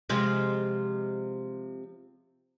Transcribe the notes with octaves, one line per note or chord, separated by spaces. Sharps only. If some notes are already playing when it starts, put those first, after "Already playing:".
C3 F3 G#3